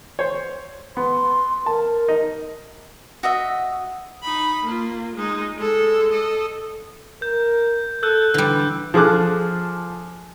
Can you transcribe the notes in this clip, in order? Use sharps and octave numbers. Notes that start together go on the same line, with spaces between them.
C5 C#5
B3 C6
A#4 A5
D#4
F#4 D#5 E5
D#4 B5
A#3 F4
G#3 D#4
G#3 A4
A4 D#5
A#4 G6
A4 E6 F#6 G6
D3 E3 G3
F3 G#4 A4 D6 F#6